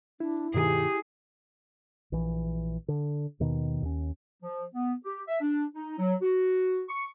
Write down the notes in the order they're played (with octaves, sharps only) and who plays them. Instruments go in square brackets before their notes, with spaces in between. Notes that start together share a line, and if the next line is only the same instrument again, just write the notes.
[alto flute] D4 [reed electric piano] E4
[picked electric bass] G2 B2 D#3 [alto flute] G4 [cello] G#4
[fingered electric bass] A#1 E3
D3
D#2 B2 D#3
D#2 C#4
[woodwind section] F3
B3
G4
E5
D4
D#4
F#3
F#4
C#6